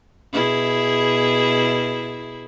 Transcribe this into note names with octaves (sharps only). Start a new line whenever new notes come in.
B2 E4 G#4